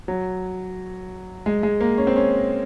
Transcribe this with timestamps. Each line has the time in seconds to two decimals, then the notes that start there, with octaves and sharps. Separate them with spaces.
0.08 F#3
1.46 G#3
1.63 G#3
1.81 A#3
1.98 C#4
2.07 C4
2.16 C#4